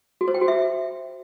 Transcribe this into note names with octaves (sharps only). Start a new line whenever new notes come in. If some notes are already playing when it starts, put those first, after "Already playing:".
F#4
C5
G5
F#4
E5